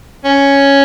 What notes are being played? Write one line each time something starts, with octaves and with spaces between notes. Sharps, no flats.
C#4